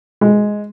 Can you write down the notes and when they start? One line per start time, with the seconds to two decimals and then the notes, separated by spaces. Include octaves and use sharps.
0.21 G#3